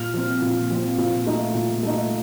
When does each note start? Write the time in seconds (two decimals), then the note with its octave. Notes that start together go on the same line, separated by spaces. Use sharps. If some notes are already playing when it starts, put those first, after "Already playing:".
Already playing: A#2 F6
0.14 F3 C4
0.42 A#2
0.70 F3 C4
0.98 A#2
1.26 A3 D#4
1.54 A#2
1.83 A3 D#4